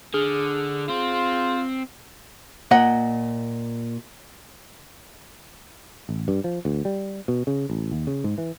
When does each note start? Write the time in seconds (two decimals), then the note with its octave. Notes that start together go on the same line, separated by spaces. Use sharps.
0.14 D3 G#4 D#6 F6
0.89 C4 F4
2.71 A#2 D#5 F#5
6.09 A1
6.28 G2
6.44 F3
6.65 D2
6.85 G3
7.28 B2
7.47 C#3
7.70 A1
7.92 D#2
8.07 C#3
8.24 G#2
8.38 E3